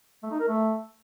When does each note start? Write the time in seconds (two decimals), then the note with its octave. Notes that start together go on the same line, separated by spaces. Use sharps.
0.23 A3
0.31 D#4
0.40 A#4
0.48 A3